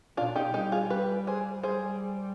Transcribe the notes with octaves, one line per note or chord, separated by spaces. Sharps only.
B2 D4 F4
D#4 G4
G3 D#4 G4
F4 G#4
G3 G4 B4
G#4 C5
G3 G#4 C5